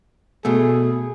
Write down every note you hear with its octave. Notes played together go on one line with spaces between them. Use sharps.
B2 A3 G#4